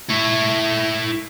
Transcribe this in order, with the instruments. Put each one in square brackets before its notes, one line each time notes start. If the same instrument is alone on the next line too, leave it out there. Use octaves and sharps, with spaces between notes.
[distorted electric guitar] E4 C#5